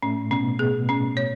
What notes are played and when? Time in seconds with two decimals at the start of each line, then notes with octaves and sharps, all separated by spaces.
0.03 A2 A3 C#4
0.31 B2 B3 C#4
0.59 B2 B3 G#4
0.89 C#4
1.17 C#5